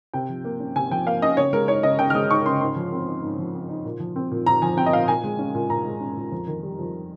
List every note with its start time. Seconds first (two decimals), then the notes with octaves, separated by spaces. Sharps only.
0.14 C3 G5
0.29 F3
0.45 A#3
0.60 C#4
0.75 C3 G#5
0.91 F3 G5
1.06 A#3 F5
1.22 C#4 D#5
1.37 C#3 C#5
1.53 G#3 A#4
1.68 D#4 C#5
1.83 C#3 D#5
1.99 C#3 G5
2.10 F6
2.15 G#3 D#6
2.30 D#4 C#6
2.46 C#3 C6
2.61 G#2 C6
2.76 F3
2.92 C4
3.07 D#4
3.23 G#2
3.38 F3
3.54 C4
3.69 D#4
3.85 A#2
4.00 F3
4.16 C4
4.31 A#2
4.46 A#2 A#5
4.62 F3 G#5
4.77 C4 G5
4.86 D#5
4.93 A#2 F5
5.08 A#2 G#5
5.24 G#3
5.39 C#4
5.55 A#2
5.70 A#2 A#5
5.85 G#3
6.01 C#4
6.17 A#2
6.32 F2
6.47 D#3
6.63 G3
6.79 F2